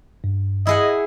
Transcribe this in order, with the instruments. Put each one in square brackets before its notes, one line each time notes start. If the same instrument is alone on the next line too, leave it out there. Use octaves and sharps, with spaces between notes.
[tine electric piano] G2
[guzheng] E4 G#4 F#5 [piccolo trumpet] D#5